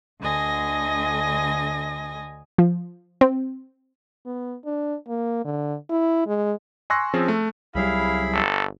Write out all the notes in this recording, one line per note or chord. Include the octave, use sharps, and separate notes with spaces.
D2 D3 D#5 G#5 A#6
F3
C4
B3
D4
A#3
D3
E4
G#3
G#5 C6 C#6 E6 F#6 A#6
F3 C4 C#4 G#4
A3
C2 F#3 G3 E4 G#4 F5 B5
G1 A4